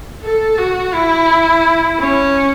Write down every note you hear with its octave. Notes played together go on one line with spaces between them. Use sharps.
A4
F#4
E4
C#4